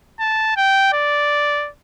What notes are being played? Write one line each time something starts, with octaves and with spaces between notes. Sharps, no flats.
A5
G5
D5